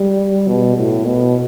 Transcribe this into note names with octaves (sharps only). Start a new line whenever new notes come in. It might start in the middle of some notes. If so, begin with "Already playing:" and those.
Already playing: G3
B2
A2
B2